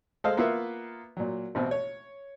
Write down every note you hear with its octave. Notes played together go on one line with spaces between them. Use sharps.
G#3 A4 C5 D#5 F5
A#3 B3 F4 B4 E5
A#2 F#3
A1 B2 C4
C#5